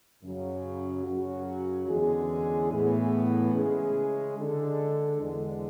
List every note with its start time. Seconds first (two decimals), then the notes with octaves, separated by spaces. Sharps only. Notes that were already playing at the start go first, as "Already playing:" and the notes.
0.22 F#2 C#3 F#3
1.05 F#2 C#3 F#3 C#4 F#4
1.88 E2 D3 G#3 C#4 G#4
2.71 A2 E3 B3
3.53 C#3 G#3 C#4 E4 G#4
4.37 D3 G#3 D4 A4
5.20 E2 D3 G#3